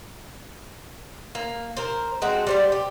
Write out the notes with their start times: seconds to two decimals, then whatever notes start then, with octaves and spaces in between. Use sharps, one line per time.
1.35 A#3
1.77 A#4 C5
2.22 G#3 A3 C4 F#4
2.47 G3 C5 D5
2.72 G4